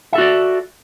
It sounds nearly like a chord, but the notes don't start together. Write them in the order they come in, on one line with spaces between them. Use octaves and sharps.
E5 A4 F#4 D5